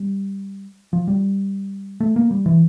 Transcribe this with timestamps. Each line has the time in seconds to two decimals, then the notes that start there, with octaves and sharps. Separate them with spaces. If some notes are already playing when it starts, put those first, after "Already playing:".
Already playing: G3
0.93 F3
1.08 G3
2.00 A3
2.16 A#3
2.31 G3
2.46 E3